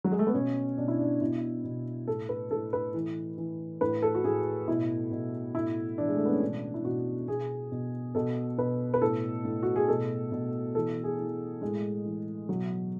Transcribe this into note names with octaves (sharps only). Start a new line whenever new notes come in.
F#3
G#3
A3
B3
B2 C#4
B2 D4
E4
D4
B2 E4
B2
A2 A4
B4
A2 A4
B4
E3
E3
A2 B4
A4
F#4
A2 G#4
B2 E4
B2
A2 E4
E3 D4
G#3
A3
B3
C#4
B2 D4
E4
B2 F#4
B2 G#4
B2
B2 A4
B2 B4
B4
A2 A4
A2
F#4
G#4
B2 A4
B2
E3 A4
G#4
E3
A2 G#3
E3
B2 F#3